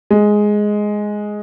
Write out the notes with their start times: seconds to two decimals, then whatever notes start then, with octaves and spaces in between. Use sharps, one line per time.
0.11 G#3